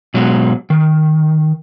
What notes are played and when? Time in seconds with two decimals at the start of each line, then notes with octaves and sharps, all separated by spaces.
0.14 B2 F#3 G#3
0.70 D#3